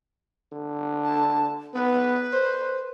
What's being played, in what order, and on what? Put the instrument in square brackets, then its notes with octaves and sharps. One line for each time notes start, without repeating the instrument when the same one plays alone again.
[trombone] D3
[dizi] A5
[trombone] B3 [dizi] B4
[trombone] C5